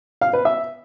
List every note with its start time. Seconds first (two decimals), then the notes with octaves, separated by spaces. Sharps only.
0.21 F5
0.33 B4
0.45 E5